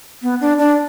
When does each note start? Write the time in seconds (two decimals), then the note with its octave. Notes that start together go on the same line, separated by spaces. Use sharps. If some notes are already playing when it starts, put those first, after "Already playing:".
0.22 B3
0.41 D4
0.58 D4